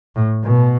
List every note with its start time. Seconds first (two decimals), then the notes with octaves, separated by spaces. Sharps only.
0.16 A2
0.44 B2